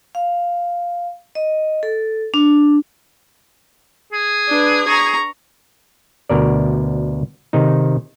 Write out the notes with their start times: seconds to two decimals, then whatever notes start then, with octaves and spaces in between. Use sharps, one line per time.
0.15 F5
1.35 D#5
1.83 A4
2.34 D4
4.13 G#4
4.48 D4 B4
4.88 A#5 C#6
6.29 D2 B2 A#4 D5
7.53 C3 D#3 D#4